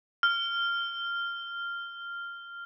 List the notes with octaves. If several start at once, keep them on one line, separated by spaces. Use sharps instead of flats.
F6